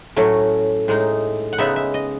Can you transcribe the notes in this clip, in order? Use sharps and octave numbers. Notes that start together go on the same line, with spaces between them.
A2 F#3 A3 C#4
A2 G#3 D#4
F#5
C#3 G#3 B3 D#4 E5
E5
D#5